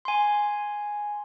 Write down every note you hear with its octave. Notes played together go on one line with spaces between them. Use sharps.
G#5 C6